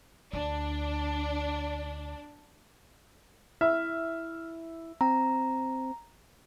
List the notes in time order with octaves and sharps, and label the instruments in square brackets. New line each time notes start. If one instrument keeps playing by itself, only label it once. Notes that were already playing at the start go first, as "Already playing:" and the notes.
[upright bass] D2 [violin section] D4
[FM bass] E4 [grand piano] E5 [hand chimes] F6
[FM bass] C4 [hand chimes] A#5